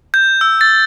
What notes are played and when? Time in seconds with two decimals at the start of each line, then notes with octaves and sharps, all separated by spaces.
0.14 G6
0.41 E6
0.61 A6